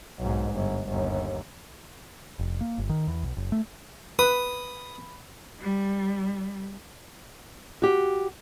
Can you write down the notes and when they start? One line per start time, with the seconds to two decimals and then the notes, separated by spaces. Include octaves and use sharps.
0.19 B1 G#2
0.52 G1
0.88 G1 D#2
2.39 F1
2.61 A#3
2.78 G1
2.89 D#3
3.07 E2
3.23 B1
3.37 F#1
3.52 A3
4.19 B4 B5 D#6
5.61 G3
7.82 F#4 G4